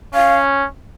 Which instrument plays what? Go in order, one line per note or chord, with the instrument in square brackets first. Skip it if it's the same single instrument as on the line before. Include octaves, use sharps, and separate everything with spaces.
[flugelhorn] C#4 [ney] F5